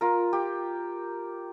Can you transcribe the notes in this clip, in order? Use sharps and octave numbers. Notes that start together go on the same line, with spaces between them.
F4 A#4
G4